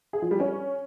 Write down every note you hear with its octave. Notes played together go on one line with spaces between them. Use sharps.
G#4
F3
G3
C#4